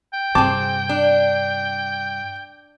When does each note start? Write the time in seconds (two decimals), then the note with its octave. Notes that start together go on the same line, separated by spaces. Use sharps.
0.13 G5
0.35 G2 C3 C4 G#4 A5 D6
0.89 D4